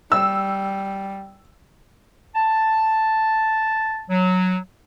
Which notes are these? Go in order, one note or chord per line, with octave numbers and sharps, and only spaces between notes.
G3 E6
A5
F#3